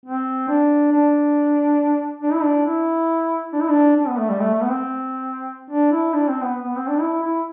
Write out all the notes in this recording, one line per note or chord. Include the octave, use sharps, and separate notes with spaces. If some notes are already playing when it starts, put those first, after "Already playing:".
C4
D4
D4
D4
E4
D4
E4
D4
E4
D4
D4
B3
A3
G3
A3
A3
B3
C4
D4
E4
D4
C4
B3
B3
C4
D4
E4
E4